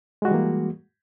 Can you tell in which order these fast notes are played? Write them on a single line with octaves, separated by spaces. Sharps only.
G#3 F#4 G3 E3 A#3